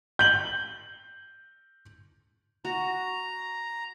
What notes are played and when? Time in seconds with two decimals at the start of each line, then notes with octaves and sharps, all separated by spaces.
0.19 G6 F#7
2.65 F#4 A#5